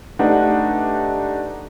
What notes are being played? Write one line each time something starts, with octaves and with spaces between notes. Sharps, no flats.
A3 D4 D#4 G4 B4 F#5